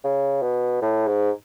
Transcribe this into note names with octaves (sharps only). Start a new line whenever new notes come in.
C#3
B2
A2
G#2